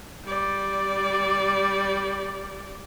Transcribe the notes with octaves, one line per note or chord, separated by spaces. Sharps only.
G3 D5